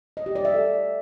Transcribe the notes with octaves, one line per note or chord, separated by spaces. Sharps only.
D#5
G4
D5
E5
A4